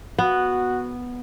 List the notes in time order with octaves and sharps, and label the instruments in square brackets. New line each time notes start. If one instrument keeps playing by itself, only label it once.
[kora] B3 [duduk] F#4